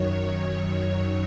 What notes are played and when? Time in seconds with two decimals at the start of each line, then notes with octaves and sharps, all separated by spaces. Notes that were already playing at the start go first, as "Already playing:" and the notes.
Already playing: F#2 D#3 F#3 C#5
0.25 C#5